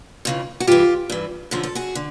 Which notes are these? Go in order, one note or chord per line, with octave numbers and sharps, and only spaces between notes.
F2 C#3 E3
F#4
G2 E3 F4 G4
G2 E3
F#2 D3 F3 G#4
A4
F#4 G#4
D3